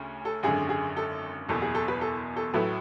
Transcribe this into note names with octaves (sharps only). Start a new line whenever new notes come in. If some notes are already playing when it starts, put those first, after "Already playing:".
Already playing: D2 C#3 C#4
A4
G#1 F#2 D3 G#4
G#4
A4
F#1 E2 B2 A4
G#4
A4
B4
A4
A4
A1 A2 F#3 A3 B4